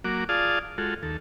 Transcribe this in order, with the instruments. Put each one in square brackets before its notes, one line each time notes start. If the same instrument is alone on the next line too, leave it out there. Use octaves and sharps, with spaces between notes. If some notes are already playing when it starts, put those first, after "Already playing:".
[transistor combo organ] F#3 A#3 F#4 D6
F4 G#4 D5 F5 A5 D#6
G#3 F4 F#4 A4
D#2 A4